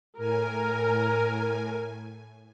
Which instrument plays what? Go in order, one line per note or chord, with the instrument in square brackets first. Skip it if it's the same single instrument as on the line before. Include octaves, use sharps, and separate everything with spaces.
[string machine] A2 G#5 [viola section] A#4